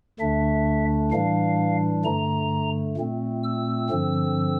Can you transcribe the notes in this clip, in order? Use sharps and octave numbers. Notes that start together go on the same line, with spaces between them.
D2 D3 A3 D4 E5
A2 E3 G3 D4 F5
G2 D3 A3 A#5
A#2 A3 C4
E6
G2 D3 F3 C4